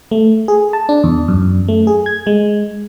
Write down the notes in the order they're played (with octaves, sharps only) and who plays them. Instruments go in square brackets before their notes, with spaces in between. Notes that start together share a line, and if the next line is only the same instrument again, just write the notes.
[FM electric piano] A3
G#4
A5
D4
E2
F#2
A3
G#4
G#6
G#3